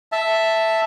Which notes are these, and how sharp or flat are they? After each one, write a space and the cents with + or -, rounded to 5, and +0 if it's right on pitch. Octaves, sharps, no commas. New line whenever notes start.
E5 +0 A5 +0